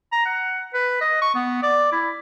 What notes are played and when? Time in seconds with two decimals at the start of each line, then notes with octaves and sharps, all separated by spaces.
0.12 A#5
0.26 F#5
0.74 B4
1.01 D#5
1.22 C#6
1.35 B3
1.63 D5
1.92 E4